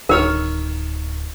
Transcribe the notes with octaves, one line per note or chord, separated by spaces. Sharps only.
D1 D#3 A#4 C#5 F6